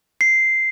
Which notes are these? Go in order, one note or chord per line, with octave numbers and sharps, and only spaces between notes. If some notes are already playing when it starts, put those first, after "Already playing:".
C7